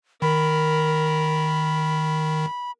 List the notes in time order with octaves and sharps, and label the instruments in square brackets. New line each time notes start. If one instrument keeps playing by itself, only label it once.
[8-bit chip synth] D#3 [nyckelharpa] A#4 [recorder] B5